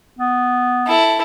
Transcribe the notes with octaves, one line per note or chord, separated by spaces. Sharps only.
B3
E4 A4